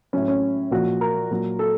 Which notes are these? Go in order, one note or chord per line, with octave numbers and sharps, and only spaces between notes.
A2 F#3 C#4
C#4
A#2 F3 F#4
A#4
A#2 F#3
A4